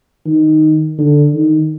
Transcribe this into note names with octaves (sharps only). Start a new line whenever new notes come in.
D#3
D3
D#3